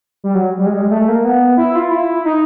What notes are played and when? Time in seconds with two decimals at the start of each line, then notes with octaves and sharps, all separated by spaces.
0.24 G3
0.35 F#3
0.58 G3
0.66 G#3
0.74 G3
0.82 G#3
0.91 A3
1.08 A#3
1.25 B3
1.57 E4
1.75 F4
1.91 E4
2.25 D#4